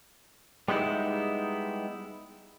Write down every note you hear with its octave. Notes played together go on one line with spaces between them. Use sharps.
G3 G#3 B3 D#4 E4